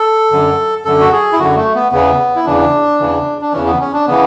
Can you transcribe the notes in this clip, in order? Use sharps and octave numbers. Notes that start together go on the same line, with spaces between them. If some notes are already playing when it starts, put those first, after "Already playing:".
Already playing: A4
F#2 D3
F#2 D3 A4
F#4
G#4
E4
F#2 D3 F#4
A3
B3
E2 C#3 E3 B3
E4
E2 C#3 E3 D4
E2 C#3 E3
D4
E2 C#3 E3 C#4
B3
C#4
D4
C#3 E3 B3